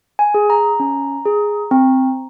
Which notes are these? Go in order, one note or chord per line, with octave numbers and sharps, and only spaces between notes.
G#5
G#4
A#5
C#4
G#4
C4